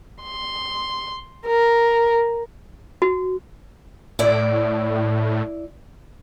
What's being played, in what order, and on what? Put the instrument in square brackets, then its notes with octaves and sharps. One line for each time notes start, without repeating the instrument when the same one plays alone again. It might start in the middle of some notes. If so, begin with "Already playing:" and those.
[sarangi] C6
A#4
[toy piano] F#4
[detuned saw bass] A2 [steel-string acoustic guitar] E4 D5